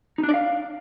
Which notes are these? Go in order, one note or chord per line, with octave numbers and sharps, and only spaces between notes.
D#4
D4
D5
F5